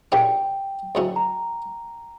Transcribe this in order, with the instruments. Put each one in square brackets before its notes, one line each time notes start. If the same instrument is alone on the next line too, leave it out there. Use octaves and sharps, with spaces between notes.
[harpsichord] A#1 A#2 G3 C#4 E4 [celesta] G5
[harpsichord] D2 C#3 F#3 C#4 E4
[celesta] A#5